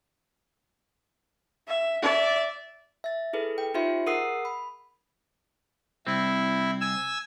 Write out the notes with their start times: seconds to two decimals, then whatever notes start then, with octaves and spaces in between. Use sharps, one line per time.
1.68 E5
2.02 D5 E5
3.04 E5 A6
3.33 E4 G#4 A4 B4
3.58 G5
3.74 D#4 F4 G4 C5 E5 C6
4.06 G#4 A#4 F#5 D#6 E6 C7
4.45 B5
6.07 C2 C4 E4
6.81 G#5 E6